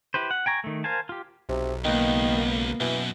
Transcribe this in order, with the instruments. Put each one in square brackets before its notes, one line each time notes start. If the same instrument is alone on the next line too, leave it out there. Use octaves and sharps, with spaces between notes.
[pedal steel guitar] E4 G4 B4 C5
F#5
G5 G#5 A#5 C#6
D#3 A3
A#4 C5 F5 G#5 A5
F4 G4
[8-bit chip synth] B1 [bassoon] C3
[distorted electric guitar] C#2 [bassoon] D#3 [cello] A#3 B3
[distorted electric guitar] F#2 [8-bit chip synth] B2 [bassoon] E3